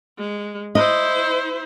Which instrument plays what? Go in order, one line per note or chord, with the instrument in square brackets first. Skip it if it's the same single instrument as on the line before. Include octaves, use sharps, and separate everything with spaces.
[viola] G#3
[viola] E4 C5 [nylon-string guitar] D#5